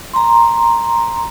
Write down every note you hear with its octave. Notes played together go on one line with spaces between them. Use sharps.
A#5 C6